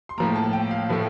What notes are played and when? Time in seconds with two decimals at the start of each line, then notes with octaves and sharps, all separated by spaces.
0.09 C6
0.18 A2 F3 A#3 A#5
0.36 A5
0.53 G5
0.71 F5
0.89 A2 F3 A3